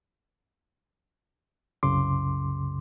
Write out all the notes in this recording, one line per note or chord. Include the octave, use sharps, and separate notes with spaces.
C2 F#2 C#3 C6 D6